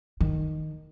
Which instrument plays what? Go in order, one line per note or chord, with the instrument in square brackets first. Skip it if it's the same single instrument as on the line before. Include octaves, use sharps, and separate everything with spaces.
[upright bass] D#3